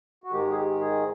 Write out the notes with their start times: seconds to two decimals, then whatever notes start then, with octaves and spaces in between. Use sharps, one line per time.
0.24 F#4
0.32 G#2 D#3 G#3 G4
0.51 G#4
0.56 G4
0.80 G#4